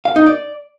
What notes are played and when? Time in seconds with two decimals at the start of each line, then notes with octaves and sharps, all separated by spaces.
0.05 F5
0.16 D#4
0.26 D5